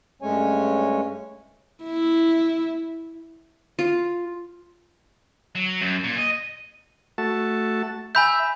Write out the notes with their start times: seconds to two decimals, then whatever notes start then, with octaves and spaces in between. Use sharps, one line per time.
0.22 G2 G#3 A3 C#4 C#5 G#5
1.84 E4
3.79 F4
5.55 F#3
5.81 F#2
6.04 A#2
6.18 D#5
7.18 A3 F#4 A5
8.15 E5 G#5 B5 G6